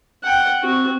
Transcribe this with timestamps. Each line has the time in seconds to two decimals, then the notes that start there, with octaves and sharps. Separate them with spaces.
0.24 F#5 G5
0.63 C4 F#4